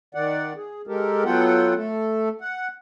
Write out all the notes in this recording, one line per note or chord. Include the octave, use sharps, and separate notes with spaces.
D#3 D5 F#5
G#4
G#3 G4 A4 A#4
F#3 B3 F4 A4 F#5 G5
A3 A4
F#5